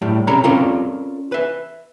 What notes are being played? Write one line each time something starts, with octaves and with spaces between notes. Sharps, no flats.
A2 G3 A3
C3 C#4 A4 A#5 B5
C4 C#4 F4 A4 A#4 D5
B4 E5